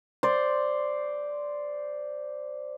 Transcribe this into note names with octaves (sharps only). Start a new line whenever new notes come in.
C5 D5